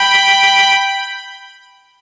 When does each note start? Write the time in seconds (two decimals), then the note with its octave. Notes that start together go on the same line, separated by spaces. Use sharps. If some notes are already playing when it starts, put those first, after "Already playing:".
Already playing: G5 B5